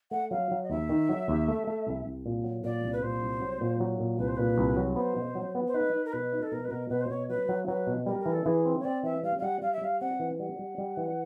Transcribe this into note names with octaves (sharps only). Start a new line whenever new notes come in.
A3 F#5
F#3 F5
F#3
D#5
D#2 E5
D#3
F#3
D#2
A3
A3
C2
C2
A#2
F#3
A#2 D5
C2
B4
A#2 C5
C2
F#3
A#2
F#3
A#2
C2 B4
C5
A#2 B4
C2
F#3
B3 C5
B2
F#3
B3
C5
D#4 B4
D#4
A#4
B2 B4
D#4
A4
B2 A#4
B4
B2 A#4
B2 B4
C5
B2 C#5
F#3 B4
F#3
F#3 B4
B2
G3 A#4
A#4
E3
A4
E3 G#4
C4
C#5
C4 D5
E3 E5
G3 F5
F5
G3 F#5
G3 F5
E5
G3 F5
C4 F#5
E3
G3 F#5
G3
G3
E3